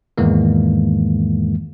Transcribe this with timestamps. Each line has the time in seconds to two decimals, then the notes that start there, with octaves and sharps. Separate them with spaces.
0.18 E2 G#2 D#3 E3 G#3 A#3